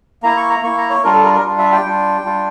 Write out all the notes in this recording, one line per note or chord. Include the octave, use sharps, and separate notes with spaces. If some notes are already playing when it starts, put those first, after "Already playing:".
A#3 E4 A#5
C#6
A#5
A#3 E4 C#6
A#5
C#5
G3 D4 F4 A#4
A4
A#4
A#4
G3 D4 F4
E5
G5
G3 D4 F4
G3 D4 F4